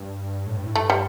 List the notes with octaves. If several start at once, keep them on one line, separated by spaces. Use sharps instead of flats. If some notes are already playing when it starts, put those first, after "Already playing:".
Already playing: G2
A2
G2
A2
G2 A3
G3